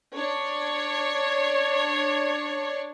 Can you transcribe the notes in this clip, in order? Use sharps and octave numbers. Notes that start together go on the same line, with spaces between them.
D4 C#5